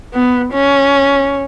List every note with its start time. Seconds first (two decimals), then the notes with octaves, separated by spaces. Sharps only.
0.14 B3
0.53 C#4